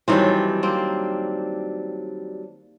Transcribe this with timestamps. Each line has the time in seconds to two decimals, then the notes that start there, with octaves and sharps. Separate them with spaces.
0.08 D#3 E3 F#3 G3 C4 D4
0.63 A#3 C4